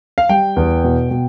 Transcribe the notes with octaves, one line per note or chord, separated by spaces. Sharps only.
F5
G3 G5
E2
B2
B2